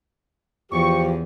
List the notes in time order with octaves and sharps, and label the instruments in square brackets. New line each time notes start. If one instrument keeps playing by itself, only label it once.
[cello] E2 [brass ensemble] F3 G4 [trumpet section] C#6